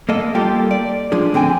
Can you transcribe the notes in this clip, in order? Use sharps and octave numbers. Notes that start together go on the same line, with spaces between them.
A#3 A4 D#5
G3 A#3 F4 G4 A4 A#4
D5
F3 G#3 D4 G#4
D3 C4 G5 G#5